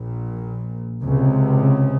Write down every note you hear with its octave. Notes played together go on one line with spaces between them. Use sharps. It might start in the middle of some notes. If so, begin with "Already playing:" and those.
Already playing: A#1 A#2
C#2 C3
C#3